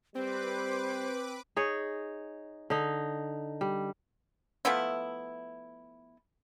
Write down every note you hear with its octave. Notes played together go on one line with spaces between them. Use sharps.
G3 C4 B4 C5 D6
D#4 G#4 C#5
D3 D#4
G3
F3 A3 B3 E4